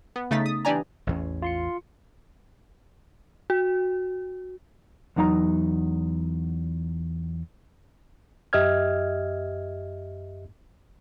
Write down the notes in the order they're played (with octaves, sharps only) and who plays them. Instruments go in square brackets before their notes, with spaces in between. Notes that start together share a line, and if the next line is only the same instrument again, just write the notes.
[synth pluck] B3
C#3 A3 D#4 A6 B6
D#6
E3 D4 G4 D5 G#5 A#5
[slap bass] A1 E2 C#4
[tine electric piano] F4 C6 C#7
[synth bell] F#4
[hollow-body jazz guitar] E2 F#3 D#4 F5 A#5
[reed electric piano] F#2 G4 D#5 E5 F6 G#6